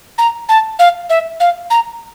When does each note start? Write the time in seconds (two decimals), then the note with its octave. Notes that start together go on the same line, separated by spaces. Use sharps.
0.18 A#5
0.49 A5
0.79 F5
1.10 E5
1.40 F5
1.70 A#5